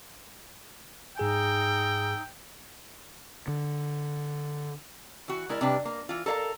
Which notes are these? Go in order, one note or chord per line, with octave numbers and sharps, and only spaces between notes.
G#2 D#4 G#4 G5 G#5 A#5 E6
D3
E3 F#4
G#3 E4 A#4 D5
C3 G3 D4 B4
A#3
E3 F4
A4 A#4 C#5 F5 A#5